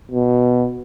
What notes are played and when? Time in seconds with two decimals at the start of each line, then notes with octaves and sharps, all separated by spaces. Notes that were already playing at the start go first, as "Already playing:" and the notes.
0.11 B2